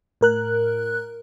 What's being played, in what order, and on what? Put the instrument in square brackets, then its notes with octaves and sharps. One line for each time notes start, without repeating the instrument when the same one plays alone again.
[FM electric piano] A2 A#4 F#6